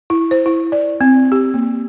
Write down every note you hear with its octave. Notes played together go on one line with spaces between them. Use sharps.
E4
C5
E4
D5
C4
G4
A#3